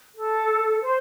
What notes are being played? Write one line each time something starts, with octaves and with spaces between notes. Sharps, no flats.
A4
C5